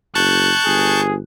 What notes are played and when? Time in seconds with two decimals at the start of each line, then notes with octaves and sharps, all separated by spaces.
0.15 F#1 A5 C#6 F#6 G6
0.66 G1 G#4